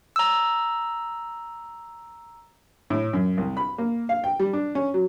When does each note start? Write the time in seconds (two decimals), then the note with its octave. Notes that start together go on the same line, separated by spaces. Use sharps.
0.16 A#5 E6
2.90 A2
3.13 F#2
3.37 C2
3.57 B5
3.78 A#3
4.09 F5
4.24 G5
4.40 G3
4.53 D4
4.75 C#4
4.94 F#3